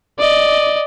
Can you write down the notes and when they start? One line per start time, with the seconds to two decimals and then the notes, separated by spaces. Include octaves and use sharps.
0.19 D5 D#5